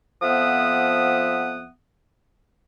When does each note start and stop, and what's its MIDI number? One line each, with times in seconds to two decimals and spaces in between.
0.22 1.68 41
0.22 1.68 53
0.22 1.68 59
0.22 1.68 76
0.22 1.68 78
0.22 1.68 87